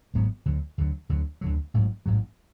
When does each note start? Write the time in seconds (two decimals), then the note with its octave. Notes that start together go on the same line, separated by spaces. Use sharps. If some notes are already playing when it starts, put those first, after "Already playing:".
0.14 G#1 G#2 F#3 B3
0.46 D2 D3 F#3
0.78 D2 D3 F#3
1.09 D2 D3 F#3
1.41 D2 D3 F#3
1.74 A1 G#2 F#3
2.06 A1 G#2 F#3